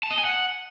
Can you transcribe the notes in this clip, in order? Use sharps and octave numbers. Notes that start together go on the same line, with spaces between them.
A5
D#5
G#5
F#5